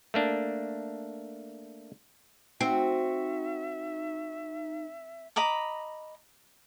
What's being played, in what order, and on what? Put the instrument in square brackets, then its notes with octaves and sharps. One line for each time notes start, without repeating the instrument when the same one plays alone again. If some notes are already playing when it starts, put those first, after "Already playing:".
[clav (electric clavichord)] A3 A#3 D4
[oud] C4 [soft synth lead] D#4 [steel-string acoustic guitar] F#4 [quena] E5
[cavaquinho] D#5 A#5 B5 D6